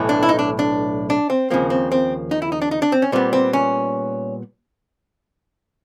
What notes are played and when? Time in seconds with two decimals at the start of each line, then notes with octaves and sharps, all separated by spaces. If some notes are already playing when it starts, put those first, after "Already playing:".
Already playing: B1 A2 E3
0.09 D4
0.23 E4
0.29 D#4
0.39 D4
0.59 D4
1.10 D4
1.30 C4
1.50 D#2 C#3 F3 A#3 C4
1.70 C4
1.92 C4
2.31 D#4
2.42 E4
2.52 D#4
2.62 D4
2.71 D#4
2.82 D4
2.92 C4
3.02 C#4
3.12 A#2 G3 B3 C4
3.33 C4
3.53 C#4